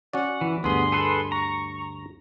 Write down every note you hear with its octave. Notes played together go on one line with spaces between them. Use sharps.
C#4 F#4 D5 F#5
E3
D2 G2 B3 G#4 C6
G#4 A4 B4
A#5 C#6